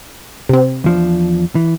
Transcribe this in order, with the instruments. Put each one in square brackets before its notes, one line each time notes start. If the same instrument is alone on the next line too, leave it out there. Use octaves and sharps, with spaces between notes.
[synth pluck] C3 C4
[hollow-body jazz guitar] E2 F3 D4
E3